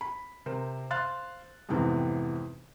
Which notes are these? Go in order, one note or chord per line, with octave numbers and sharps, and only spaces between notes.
B5
C3 A#4 C5
C5 F5 C6 F#6 A6
F2 G#2 C3 E3 B3 C4